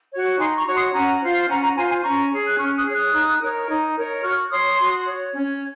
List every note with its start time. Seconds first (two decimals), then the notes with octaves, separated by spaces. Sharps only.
0.11 F#4 C#5
0.38 D#4 G#5 C6
0.57 A#5 C#6
0.65 F#4 C#5
0.75 C6 D#6
0.93 C#4 F#5 A#5
1.21 F4 C5
1.48 C#4 F#5 A#5
1.62 F#5 A#5
1.75 F4 C5 G#5 C6
1.89 G#5 C6
2.02 C#4 A#5 C#6
2.31 G#4 C#5
2.47 F#6
2.58 C#4 C#6 F6
2.77 D#6 F#6
2.85 G#4 C#5
2.94 D#6 F#6
3.13 D#4
3.41 A#4 C#5
3.68 D#4
3.95 A#4 C#5
4.23 F#4 C#6 F6
4.50 C#5 C6 D#6
4.78 F#4
5.05 C#5
5.33 C#4